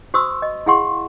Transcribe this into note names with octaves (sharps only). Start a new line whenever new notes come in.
F#4 C5 C6 C#6 D#6 E6
D#5
E4 G#4 F5 F#5 C6 C#6